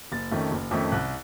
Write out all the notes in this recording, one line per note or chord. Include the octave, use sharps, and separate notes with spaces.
F#1 A6
F2 D#3 A3 C#4
F#1
F2 D#3 A3 C#4
C2 F#6